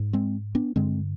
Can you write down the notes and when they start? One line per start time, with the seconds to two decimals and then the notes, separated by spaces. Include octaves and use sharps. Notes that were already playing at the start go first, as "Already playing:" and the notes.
Already playing: G#2
0.13 G#3 C4
0.55 B3 D4
0.76 G2 D3 G#3 C4